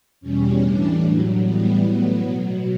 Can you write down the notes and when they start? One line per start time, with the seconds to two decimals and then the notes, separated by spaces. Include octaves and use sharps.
0.21 E2 B2 G3 C#4
0.61 A2 E3 G3 D4
1.02 A2 F#3
1.42 A2 E3 G3 B3
1.83 A2 F#3
2.23 B2 F#3